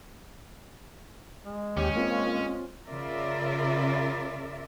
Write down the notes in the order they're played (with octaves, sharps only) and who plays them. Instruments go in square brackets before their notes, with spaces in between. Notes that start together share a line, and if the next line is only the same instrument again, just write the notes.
[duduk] G#3
[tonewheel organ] D#2 G4 [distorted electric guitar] C#4
[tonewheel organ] A#3 [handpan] C4 F4 C#5
[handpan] F4
[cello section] C#3 F4 A#4 D5 E5